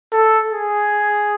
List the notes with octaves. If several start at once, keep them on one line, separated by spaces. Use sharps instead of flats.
A4
G#4